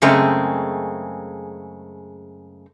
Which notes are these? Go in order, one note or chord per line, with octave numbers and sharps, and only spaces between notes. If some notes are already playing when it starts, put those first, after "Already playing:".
F#2 C#3 G#3 A3 C4